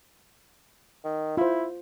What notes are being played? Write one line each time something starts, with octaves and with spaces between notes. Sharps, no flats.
D#3
E4 F4 C5